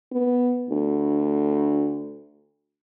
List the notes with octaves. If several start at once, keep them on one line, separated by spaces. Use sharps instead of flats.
B3
D2